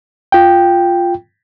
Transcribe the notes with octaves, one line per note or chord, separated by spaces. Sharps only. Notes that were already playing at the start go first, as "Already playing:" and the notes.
F4 G5